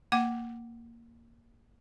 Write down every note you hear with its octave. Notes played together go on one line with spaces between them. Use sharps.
A#3 F#5 D6